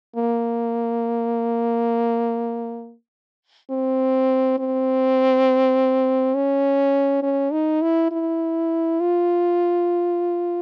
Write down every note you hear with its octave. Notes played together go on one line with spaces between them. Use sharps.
A#3
C4
C4
C#4
C#4
D#4
E4
E4
F4